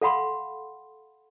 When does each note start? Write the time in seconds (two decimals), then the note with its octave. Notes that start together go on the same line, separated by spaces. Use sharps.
0.02 A4 F5 F#5 B5 C6